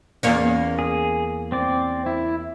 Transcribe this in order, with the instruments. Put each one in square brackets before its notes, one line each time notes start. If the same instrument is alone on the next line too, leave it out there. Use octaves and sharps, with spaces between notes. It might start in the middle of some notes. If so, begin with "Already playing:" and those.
[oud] E2 A#3 C#4
[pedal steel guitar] G#4
C4 D5
E4